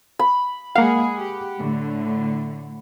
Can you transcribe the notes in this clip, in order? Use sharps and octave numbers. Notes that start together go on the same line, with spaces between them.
B5
G#3 A#3 G#4 F5 F#5
G4
A2 D3 A3